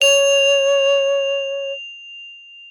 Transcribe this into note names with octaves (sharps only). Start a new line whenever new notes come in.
C#5 F7